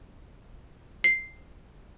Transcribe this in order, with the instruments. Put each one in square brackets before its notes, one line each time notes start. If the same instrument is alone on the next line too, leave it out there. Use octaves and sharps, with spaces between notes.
[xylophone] C7